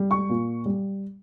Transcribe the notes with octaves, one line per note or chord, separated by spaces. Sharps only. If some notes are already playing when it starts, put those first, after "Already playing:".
Already playing: G3
C#6
A#2
G3